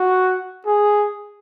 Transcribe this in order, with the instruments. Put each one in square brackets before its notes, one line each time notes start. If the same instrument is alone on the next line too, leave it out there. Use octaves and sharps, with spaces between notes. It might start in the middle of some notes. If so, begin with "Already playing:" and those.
Already playing: [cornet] F#4
G#4